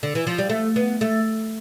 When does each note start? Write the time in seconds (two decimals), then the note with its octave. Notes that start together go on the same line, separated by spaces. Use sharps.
0.03 D3
0.15 E3
0.27 F3
0.38 G3
0.50 A3
0.76 B3
1.01 A3